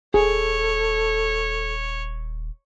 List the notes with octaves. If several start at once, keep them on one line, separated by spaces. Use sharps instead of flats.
D#1 G#4 A4 C#5